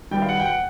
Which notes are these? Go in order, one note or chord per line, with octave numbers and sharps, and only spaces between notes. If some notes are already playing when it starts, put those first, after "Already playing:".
D#3 G3 B3 G5
F5
F#5
G5
F#5